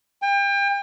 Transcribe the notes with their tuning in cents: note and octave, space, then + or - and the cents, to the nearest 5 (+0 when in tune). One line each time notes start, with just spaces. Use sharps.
G5 +35